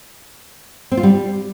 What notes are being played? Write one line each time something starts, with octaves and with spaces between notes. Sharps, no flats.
C4
F4
G3